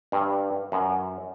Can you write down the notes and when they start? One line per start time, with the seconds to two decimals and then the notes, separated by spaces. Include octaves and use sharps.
0.12 G2
0.72 F#2